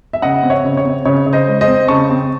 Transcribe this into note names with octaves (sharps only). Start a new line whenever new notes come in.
E5
C#3 D#5 F#5
C4
C#5 E5
C#3
C#5
C4
C#3 C#5
C#3
C5 D#5
G#3
C5 D#5
C4
C#3 A5 C#6
C4